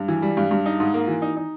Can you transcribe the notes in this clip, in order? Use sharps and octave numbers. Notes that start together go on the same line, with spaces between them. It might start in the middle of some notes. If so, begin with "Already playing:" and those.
Already playing: G2
E3
G3
G2
G2
D#4
G#2
A#3
E3
D#4
D#4